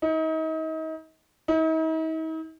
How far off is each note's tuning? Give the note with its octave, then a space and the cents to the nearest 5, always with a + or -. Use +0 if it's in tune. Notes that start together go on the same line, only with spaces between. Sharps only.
D#4 +35
D#4 +45